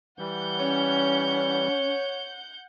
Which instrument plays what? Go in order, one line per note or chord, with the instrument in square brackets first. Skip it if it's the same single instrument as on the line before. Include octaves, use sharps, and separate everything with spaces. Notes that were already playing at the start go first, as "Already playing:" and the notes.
[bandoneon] E3 G3 [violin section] F#5 G6
[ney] C#4 [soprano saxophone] C#5